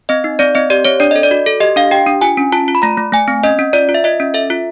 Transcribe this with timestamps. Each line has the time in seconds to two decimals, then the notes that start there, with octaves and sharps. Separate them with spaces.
0.09 C4 D#5
0.24 D#4
0.39 C4 D5
0.55 C4 D#5
0.70 G4 D5
0.85 C4 C#5
1.00 D4 D5
1.11 A4 D#5
1.23 D5
1.31 F#4
1.46 A4
1.60 G4 D#5
1.76 D4 F5
1.91 G4 G5
2.07 D4
2.21 F4 G#5
2.37 C#4
2.52 F4 A5
2.68 F4
2.75 B5
2.82 A3 A#5
2.97 A3
3.12 A3 G#5
3.28 C4
3.43 C#4 D#5
3.59 C#4
3.73 F4 D5
3.89 F4
3.94 E5
4.04 F4 D#5
4.20 C#4
4.34 A4 E5
4.50 F4